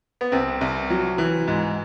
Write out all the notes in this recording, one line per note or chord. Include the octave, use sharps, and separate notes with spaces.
B3
C2 C4
C2
F#3
E3
G#2